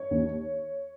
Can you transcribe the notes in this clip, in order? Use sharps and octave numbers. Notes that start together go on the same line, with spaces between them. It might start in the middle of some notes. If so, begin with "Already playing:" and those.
Already playing: C#5
D#2